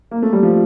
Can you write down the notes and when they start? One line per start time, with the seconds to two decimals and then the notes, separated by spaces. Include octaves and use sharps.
0.11 A#3
0.22 A3
0.33 G3
0.43 F3